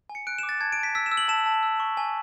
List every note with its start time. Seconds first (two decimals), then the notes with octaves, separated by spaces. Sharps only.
0.09 G#5
0.15 C#7
0.27 F#6 D7
0.39 E7
0.43 D6
0.49 A6
0.61 A5 G#6
0.72 D7
0.77 A5
0.83 B6
0.95 E6 B6
1.06 E7
1.11 E6
1.17 F#7
1.28 A5 E7
1.46 A5
1.63 E6
1.80 C#6
1.97 G#5